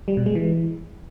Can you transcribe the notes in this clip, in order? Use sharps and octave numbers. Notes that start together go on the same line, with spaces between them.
G3
B2
G#3
E3